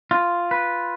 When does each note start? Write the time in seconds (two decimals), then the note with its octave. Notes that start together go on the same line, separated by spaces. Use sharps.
0.11 F4
0.51 B4